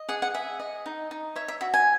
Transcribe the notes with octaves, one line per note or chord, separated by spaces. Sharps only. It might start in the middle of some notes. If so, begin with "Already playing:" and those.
Already playing: D#5
G#4 F#5
F#5
G#4 E5
D#5
D#4
D#4
C#5 E5
E5
F#4 E5
G#5